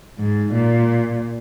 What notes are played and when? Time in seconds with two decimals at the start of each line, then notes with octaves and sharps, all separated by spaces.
0.19 G#2
0.54 A#2